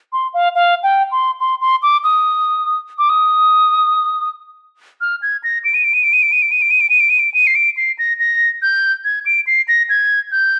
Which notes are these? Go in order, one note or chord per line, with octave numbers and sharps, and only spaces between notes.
C6
F5
F5
G5
C6
C6
C6
D6
D#6
D6
D#6
F6
G#6
A#6
D7
D#7
D7
D#7
D7
D#7
D7
D#7
D7
D#7
D7
D#7
D7
D#7
D7
D#7
D7
D#7
C7
D7
C7
A#6
A#6
G6
G#6
D7
C7
A#6
G#6
G6